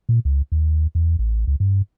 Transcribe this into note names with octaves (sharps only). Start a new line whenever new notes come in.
A#2
C#2
D#2
E2
A1
C#2
G2